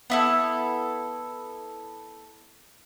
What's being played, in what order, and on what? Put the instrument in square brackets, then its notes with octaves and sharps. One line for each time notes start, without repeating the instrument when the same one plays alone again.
[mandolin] B3 E4 A4